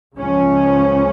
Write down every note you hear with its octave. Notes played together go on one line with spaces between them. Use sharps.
C#2 C#3 F3 C#4